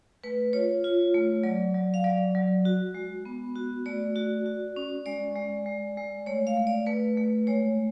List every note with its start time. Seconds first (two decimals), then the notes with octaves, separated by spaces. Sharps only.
0.24 A3 B4
0.53 F4 C#5
0.84 F4
1.14 A3
1.44 F#3 D5
1.74 F#3
1.94 F5
2.04 F#3 D5
2.35 F#3
2.65 F#4
2.94 G#3
3.25 B3
3.55 F#4
3.86 A3 D5
4.16 F#4
4.46 F#4
4.76 C#4
5.06 G#3 D5
5.36 G#3
5.66 G#3
5.97 G#3
6.26 A3 C#5
6.47 F5
6.57 A3
6.67 D5
6.86 A3 B4
7.17 A3
7.47 G#3 C#5